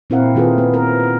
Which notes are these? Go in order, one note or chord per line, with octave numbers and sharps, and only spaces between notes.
A#2 C4 E4 A#4 F5 F#5
D#3 F4 G#4 A4 B4
B3
A#4